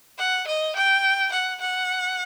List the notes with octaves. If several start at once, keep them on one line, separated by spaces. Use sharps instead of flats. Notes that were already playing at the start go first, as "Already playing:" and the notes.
F#5
D#5
G5
F#5
F#5